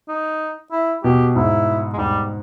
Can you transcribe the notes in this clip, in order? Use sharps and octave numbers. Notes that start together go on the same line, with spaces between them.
D#4
E4
B2 G4
G#2 E4
G#3
G#2 G3